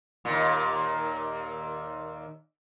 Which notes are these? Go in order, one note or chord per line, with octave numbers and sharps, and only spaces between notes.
D#2 A#2